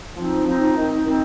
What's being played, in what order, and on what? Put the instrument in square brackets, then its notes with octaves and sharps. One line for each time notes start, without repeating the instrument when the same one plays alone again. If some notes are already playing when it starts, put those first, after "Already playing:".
[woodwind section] F3 C4 D#4
F3 C4 D#4
D#3 C4 D#4
D#3 C4 D#4